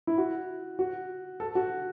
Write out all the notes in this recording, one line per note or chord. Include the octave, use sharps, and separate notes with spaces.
E4
F#4
F#4
A4
F#4